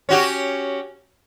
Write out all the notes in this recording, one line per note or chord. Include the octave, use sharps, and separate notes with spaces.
C#4 F#4 G4